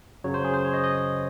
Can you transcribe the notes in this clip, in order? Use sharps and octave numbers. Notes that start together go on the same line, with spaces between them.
F#2 C#3 F#3 C#5
C5
G#4
C5
C#5
D#5
D#5